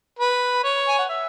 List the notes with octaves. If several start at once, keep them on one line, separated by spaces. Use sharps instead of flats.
B4
C#5
G#5
F#5
E5